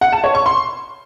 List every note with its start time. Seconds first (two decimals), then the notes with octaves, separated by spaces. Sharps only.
0.01 F#5
0.13 A5
0.24 C#5
0.35 C#6
0.46 C6